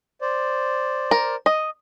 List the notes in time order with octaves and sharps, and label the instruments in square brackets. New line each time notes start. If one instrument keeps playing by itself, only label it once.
[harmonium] C5 D5
[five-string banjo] A#4
D#5